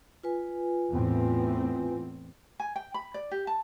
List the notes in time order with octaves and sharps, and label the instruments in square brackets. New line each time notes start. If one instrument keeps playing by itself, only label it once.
[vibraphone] F4 B4 G#5
[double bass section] E2 A2 C4
[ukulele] G#5
G5
B5
D5
G4
A5